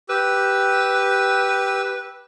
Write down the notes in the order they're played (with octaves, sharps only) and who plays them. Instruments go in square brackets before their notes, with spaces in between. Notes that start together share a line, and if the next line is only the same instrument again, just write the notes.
[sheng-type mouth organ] G4 E6 [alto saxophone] B4